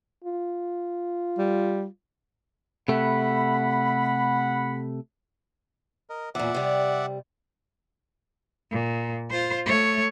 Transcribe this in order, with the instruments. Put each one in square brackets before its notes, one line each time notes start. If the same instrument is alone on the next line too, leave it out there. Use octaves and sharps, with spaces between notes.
[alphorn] F4
[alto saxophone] G3
[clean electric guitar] C3 A3 [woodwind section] F#5 B5
[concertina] A#4 D#5
[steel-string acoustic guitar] E2 A#2 [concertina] D5 E5 F#5
[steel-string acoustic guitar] C3 G3
[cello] A#2
F4 C5
A3 C#5